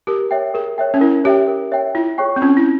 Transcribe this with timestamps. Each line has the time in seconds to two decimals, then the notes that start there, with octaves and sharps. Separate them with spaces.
0.07 G4 A#4
0.31 C#5 E5 G5
0.54 G#4 A#4
0.78 C#5 E5 G5
0.94 C#4
1.01 E4 A#4
1.24 G4 C#5 E5 G5
1.47 A#4
1.72 C#5 E5 G5
1.95 E4 F4
2.18 G#4 C#5 G5 C#6
2.36 C4
2.41 C#4 F4
2.57 E4